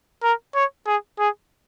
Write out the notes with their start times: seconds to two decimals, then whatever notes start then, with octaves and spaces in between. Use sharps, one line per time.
0.23 A#4
0.55 C#5
0.87 G#4
1.19 G#4